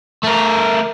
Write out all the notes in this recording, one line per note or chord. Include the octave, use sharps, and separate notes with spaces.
A3 A#4